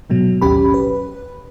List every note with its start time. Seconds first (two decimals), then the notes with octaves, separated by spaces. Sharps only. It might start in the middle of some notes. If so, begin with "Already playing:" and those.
0.10 G#2 B2 F#3
0.42 A1 D#2 C#4 G4 B5
0.74 B4